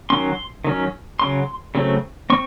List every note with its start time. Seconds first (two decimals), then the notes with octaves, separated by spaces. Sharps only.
0.10 D#3 F#3 C#4 C6
0.64 D#3 F#3 C#4
1.19 C#3 F#3 C6
1.75 C#3 F#3 A3 C4
2.30 C4 C#6